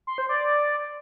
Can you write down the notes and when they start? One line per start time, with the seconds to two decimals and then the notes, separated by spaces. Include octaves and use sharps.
0.07 C6
0.18 C5
0.29 D5